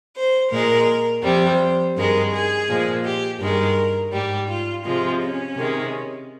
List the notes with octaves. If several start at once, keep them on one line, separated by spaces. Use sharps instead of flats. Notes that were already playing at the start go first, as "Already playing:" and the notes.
C5
A#2 G#3 A#4
F2 C3 G3 C5
G2 D#3 G#3 A#4
G#4
A#2 F3 G#3
G4
G2 D#3 G#3 A#4
G#2 G3 G4
F4
C3 F3 G#3 F4
C#4
C3 D#3 G#3